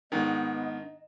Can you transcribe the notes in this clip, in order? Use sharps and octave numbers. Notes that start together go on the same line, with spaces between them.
G#2 D#3 B3 D4 D#5